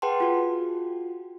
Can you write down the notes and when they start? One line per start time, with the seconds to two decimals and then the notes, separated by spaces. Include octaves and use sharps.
0.02 G#4 B4 F#5 G5 A5 C6
0.20 F4 F#4